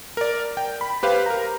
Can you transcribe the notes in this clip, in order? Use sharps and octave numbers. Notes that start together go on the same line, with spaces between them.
A#4 D5
G5
B5
G4 B4 C5 F5
A#4 A#5